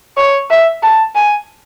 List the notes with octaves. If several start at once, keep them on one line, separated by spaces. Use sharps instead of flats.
C#5
E5
A5
G#5